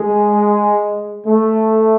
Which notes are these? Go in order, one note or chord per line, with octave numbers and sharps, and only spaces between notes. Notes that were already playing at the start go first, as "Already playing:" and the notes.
Already playing: G#3
A3